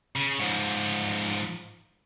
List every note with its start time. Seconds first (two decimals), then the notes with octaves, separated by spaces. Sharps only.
0.16 C#3
0.39 G#2 F3